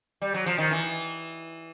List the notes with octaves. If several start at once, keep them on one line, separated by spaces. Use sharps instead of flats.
G3
F#3
F3
D#3
E3